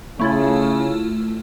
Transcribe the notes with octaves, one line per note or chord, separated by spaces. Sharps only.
C#3 A3 E4 F4